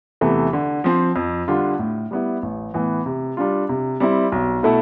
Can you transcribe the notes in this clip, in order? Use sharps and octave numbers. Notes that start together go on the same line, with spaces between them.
E2 C3 E3 A3
D3
F3 C4
F2
D3 G3 D4 F4
A2
G3 B3 E4
A1
A2 E3 B3
C3
G3 D4 F4
C3
G3 C4 E4
B1
B2 A3 E4 A4